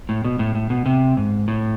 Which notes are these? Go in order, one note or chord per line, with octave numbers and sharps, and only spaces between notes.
A2
B2
A2
A2
B2
C3
G#2
A2